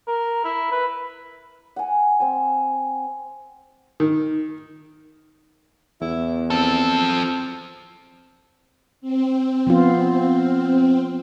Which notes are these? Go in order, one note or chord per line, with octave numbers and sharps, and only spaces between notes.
A#4
E4
B4
F#5 G#5
C4 G#5
D#3
E2 E4
F3 C4 A4
C4
F3 B3 F4